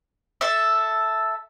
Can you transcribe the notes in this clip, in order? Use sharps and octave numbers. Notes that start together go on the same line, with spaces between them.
A4 E5